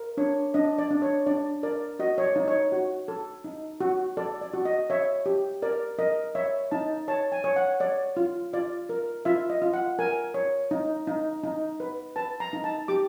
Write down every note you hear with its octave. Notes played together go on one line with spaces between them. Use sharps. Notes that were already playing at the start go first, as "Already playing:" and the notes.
Already playing: A#4
D4 C#5
D4 D#5
D5
D4
C#5
D4 D5
A#4 D5
F#4 D#5
C#5
D5
D#4
C#5
F#4
A4
D#4
F#4
A4 D5
D5
F#4
D#5
C#5 E5
G4
A#4 D5
A#4 D#5
C#5 E5
D#4 A5
C#5 A5
G#5
C#5
F#5
C#5 D5
F4
F4 D5
A#4
F4 E5
D#5
F4
F#5
A#4 G#5
C#5
D#4
D#4
D#4
B4
B4 A5
A#5
D#4
A5
G4 D6